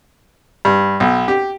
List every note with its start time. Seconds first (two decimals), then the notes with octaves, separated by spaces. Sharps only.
0.65 G2
1.00 B1
1.28 G4